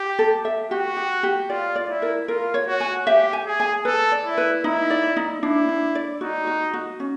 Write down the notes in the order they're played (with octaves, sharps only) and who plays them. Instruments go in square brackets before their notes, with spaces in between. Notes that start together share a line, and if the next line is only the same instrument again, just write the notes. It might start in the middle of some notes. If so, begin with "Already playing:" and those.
Already playing: [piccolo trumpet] G4
[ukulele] A4
E5
[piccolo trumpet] F#4 [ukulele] G4
[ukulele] G4
G4
[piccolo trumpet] F4 [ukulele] D5
[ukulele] D5
[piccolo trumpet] E4
[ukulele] A#4
[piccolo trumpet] F4 [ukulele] A#4
[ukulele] C#5
[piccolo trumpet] F#4
[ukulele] G#5
[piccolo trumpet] G4 [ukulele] E5
[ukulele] G#5
[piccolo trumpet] G#4
[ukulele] G#5
[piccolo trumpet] A4 [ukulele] B4
[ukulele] D5
[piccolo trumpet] E4
[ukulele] B4
[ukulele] D#4 [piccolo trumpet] E4
[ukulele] D5
D#4
[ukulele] D4 [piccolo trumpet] E4
[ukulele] D4
D5
[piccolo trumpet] D#4 [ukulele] F#4
[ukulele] F#4
F#4
C#4